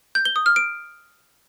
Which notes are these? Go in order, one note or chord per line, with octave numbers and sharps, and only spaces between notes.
G6
G7
D#6
F6
D7